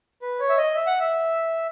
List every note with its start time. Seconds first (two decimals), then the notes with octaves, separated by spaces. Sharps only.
0.22 B4
0.40 C#5
0.49 E5
0.57 D#5
0.75 E5
0.87 F#5
1.00 E5